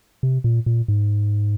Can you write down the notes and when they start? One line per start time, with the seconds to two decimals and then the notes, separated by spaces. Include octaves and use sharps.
0.23 C3
0.44 A#2
0.66 A#2
0.88 G#2